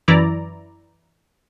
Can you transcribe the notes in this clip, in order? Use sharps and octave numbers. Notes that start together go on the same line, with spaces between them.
F#2 E3 E4 D5 A#5